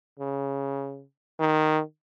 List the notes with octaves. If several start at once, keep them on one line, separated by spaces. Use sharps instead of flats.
C#3
D#3